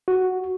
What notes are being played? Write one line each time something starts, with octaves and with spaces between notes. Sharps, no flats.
F#4